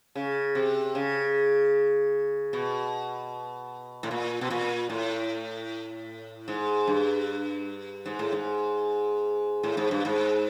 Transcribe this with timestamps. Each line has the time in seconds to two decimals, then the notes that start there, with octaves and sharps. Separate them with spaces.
0.15 C#3
0.55 C3
0.95 C#3
2.53 B2
4.03 A2
4.11 A#2
4.41 B2
4.50 A#2
4.90 A2
6.48 G#2
6.87 G2
8.06 G#2
8.19 A2
8.32 G#2
9.63 A2
9.77 G#2
9.91 G2
10.05 G#2